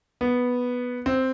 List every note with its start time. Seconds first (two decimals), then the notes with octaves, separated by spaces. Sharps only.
0.21 B3
1.06 C4